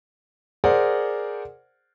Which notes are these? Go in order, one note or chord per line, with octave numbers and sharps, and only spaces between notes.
G#4 A#4 C5 D5 F#5